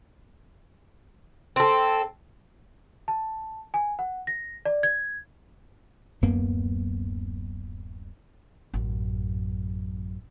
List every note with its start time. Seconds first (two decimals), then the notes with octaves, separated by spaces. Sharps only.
1.56 C4 A4
3.08 A5
3.74 G#5
3.99 F#5
4.27 A#6
4.65 D5
4.83 G#6
6.21 D1 F#2 A#3 B3
8.74 A1 F#2